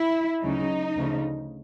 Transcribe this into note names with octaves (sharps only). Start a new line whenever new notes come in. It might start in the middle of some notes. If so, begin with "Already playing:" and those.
Already playing: E4
D2 C#3 F#3 D#4
D2 C#3 F3